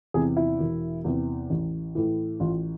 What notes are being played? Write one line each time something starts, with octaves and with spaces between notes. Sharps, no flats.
E2 C3 E3 G#4
E4
E1
E2 C3 E3
A1
A2 E3
A1 F4